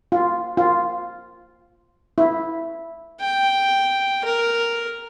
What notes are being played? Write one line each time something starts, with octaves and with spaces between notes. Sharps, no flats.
F4
F4
E4
G5
A#4